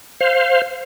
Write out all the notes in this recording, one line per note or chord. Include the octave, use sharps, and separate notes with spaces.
C5 F5